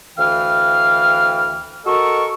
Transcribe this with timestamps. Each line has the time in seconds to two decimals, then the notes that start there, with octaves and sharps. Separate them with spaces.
0.18 D2 E3 F5 G5 F6
1.86 F#4 A4 A#4 D#5 C#6